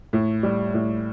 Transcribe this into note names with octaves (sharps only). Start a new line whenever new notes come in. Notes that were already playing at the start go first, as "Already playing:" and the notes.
A2
G3
A2